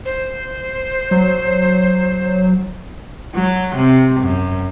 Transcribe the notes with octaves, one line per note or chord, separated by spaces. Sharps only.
C5
F#3
F#3
C3
F#2